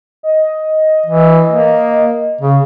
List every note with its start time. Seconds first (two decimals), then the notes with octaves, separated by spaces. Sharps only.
0.23 D#5
1.06 E3
1.50 A#3
2.41 C#3